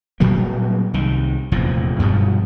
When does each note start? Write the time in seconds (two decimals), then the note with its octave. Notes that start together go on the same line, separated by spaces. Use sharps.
0.20 A#2 F#3 G3 A#3
0.94 C2 D#3
1.52 F1 E2 A#2 F3
1.99 G2 B2 F3 F#3